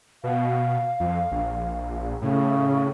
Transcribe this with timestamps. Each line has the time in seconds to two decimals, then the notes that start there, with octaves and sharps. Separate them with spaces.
0.24 B2 F5
1.00 F2
1.31 A#1
2.22 A2 C#3